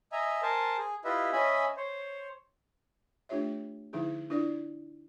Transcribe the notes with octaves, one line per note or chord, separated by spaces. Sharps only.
D#5 E5 G#5 A#5
A#4 C5 G#5 A5
G#4
E4 F4 G4 B4 D#5 E5
C#4 D#5 E5 G#5 B5
C5 C#5
A3 D4 F4 G4 C#5 E5
D3 F3 D#4 E4 G#4
D4 E4 F4 A#4 D5